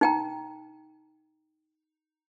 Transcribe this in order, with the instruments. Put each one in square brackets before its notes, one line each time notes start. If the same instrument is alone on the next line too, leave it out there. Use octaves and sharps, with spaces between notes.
[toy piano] D#4 G5 A#5